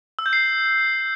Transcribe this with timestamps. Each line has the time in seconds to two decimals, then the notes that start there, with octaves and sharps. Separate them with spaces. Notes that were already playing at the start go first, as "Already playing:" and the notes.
0.19 E6
0.26 G6
0.33 C7